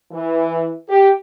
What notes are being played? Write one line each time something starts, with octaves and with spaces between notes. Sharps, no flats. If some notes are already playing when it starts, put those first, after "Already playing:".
E3
G4